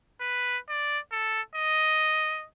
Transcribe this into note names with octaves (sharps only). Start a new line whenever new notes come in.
B4
D5
A4
D#5